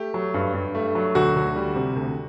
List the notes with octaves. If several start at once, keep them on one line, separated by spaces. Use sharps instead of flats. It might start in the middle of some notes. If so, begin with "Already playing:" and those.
Already playing: A3 G4
F#3
G2
G2
A3
F#3
D2 F#4
D2
G3
C3
D2